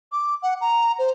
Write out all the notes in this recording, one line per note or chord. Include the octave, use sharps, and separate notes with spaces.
D6
F#5
A#5
C5